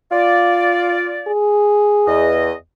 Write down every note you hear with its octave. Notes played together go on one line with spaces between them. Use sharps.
F4 D5
G#4
E2 D#5